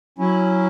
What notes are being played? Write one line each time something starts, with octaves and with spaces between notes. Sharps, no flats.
F#3 C#4 E4